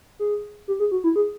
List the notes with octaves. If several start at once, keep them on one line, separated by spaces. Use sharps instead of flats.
G#4
G4
G#4
F#4
E4
G#4